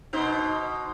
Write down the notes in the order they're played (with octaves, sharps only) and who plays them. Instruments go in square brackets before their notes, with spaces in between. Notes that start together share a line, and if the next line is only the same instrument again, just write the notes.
[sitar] B2 D#4 C5